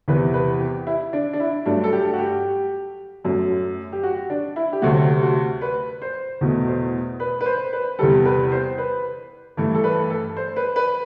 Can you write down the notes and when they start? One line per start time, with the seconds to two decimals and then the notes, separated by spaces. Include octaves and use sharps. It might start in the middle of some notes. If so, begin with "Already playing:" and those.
0.08 E2 C3 E3 B4
0.34 B4
0.60 G4
0.87 E4
1.13 D4
1.33 D4
1.40 E4
1.66 G2 F#3 A3 D4
1.84 A4
1.92 G4
2.13 F#4
2.19 G4
3.24 F#2 F#3 A3
3.93 G4
4.03 F#4
4.30 D4
4.56 E4
4.73 G4
4.82 D2 C3 F#3 A3 F#4
5.22 F#4
5.61 B4
6.02 C5
6.41 E2 B2 A3
6.68 C5
7.20 B4
7.41 B4
7.46 C5
7.73 B4
7.99 E2 C3 G3 A4
8.25 B4
8.52 C5
8.78 B4
9.57 G2 E3 A3
9.75 A4
9.84 B4
10.10 A4
10.37 C5
10.56 B4
10.76 B4